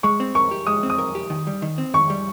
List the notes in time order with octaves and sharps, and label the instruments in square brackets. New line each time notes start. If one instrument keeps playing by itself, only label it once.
[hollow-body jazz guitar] G#3 [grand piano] C#6
[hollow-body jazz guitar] C4
[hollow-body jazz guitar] A#4 [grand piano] C#6
[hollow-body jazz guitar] G4
[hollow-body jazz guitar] G#3 [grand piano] D#6
[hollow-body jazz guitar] C4
[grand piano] D#6
[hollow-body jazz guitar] A#4
G4
D#3
G3
D#3
C4
[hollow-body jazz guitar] D#3 [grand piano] C#6
[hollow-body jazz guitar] G3